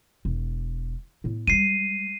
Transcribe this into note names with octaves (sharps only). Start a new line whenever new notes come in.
E1
A2 B3
G3 G#3 C7 D#7